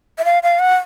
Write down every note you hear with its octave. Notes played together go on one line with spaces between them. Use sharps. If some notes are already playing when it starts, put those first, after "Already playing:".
E5
F5
F5
F#5